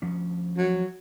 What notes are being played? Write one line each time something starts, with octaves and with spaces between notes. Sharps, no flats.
D2 F3 C#4
F#3